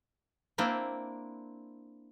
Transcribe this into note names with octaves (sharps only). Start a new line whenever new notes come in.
A#3 C4 D4 E4